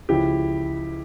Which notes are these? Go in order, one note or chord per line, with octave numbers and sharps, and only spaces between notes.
C#2 C#3 F3 E4 G4